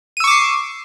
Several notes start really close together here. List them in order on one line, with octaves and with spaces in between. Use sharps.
D#7 E6 C#6 D6 C7